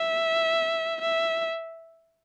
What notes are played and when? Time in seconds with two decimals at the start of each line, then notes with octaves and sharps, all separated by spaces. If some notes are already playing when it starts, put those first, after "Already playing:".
Already playing: E5
1.01 E5